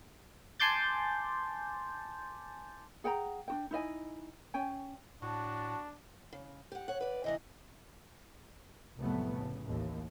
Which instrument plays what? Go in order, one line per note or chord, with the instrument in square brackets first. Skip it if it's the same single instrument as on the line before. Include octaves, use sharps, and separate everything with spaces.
[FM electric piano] G#5 A5 C6 D6 G6 A6
[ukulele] G#4 F#5 G5 A#5
D4 F#4 G5
D#4 E4 D#5 G#5
C#4 C#5 G5 G#5
[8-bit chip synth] A2 [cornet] D4 [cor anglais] F#4 [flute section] A5
[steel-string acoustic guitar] C#3
G4 F#5
C#5 F#5
B4 D5
[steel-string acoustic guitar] C3 E3 D4 [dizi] D#5
[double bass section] C2 F2 A2 F#3 A3 B3
A2 C#3
A1 D#2 A2